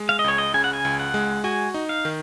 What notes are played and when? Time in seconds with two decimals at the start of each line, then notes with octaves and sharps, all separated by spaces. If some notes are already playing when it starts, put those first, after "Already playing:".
Already playing: G#3
0.09 F5
0.19 D#5
0.24 C#2 C#5
0.38 D#5
0.54 C#3 G#5
0.64 F#5
0.73 G#5
0.85 C#2
0.99 F#5
1.14 G#3
1.44 F#4 G#5
1.74 D#4
1.89 F5
2.05 D#3